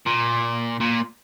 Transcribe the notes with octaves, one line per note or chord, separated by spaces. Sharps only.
A#2
A#2